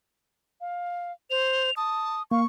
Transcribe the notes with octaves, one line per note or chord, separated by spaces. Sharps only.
F5
C5 F7
A5 D#6
A#3 F5 C#6